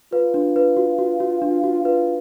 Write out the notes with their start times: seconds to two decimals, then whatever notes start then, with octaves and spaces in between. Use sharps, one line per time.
0.12 F4 B4
0.34 D4
0.56 B4
0.77 F#4
0.98 F#4
1.20 F#4
1.42 D4
1.64 F#4
1.85 F4 B4